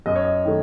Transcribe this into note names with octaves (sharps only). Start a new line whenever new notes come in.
F#2 D#5
C#5
D#5
D#3 A3